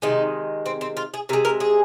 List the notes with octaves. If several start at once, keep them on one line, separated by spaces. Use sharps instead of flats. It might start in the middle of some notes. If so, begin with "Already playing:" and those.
C3 D#3 G#3 D#4
C4
C4
F4
G#4
C3 G#3 A#4
A#4
G#4